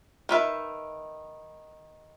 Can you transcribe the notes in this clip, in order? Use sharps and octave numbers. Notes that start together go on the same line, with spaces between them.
D#3 B4 E5